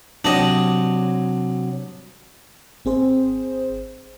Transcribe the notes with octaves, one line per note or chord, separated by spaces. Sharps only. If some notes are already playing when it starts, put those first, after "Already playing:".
C3 F#3 D4 G4 D#5
G#1 C4 G#4 C5